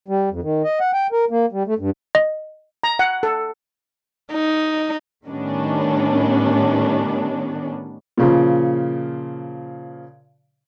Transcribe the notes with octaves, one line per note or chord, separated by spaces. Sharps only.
G3
F2
D#3
D#5
F#5
G5
A#4
A#3
G3
A3
G2
D#5
A#5
F#5
A4
D#4
A2 D#3 G3 B3 C#4 D4
A#2 C#3 F3